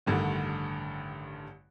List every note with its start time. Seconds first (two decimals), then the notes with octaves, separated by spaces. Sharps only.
0.06 A1 G2 D3 D#3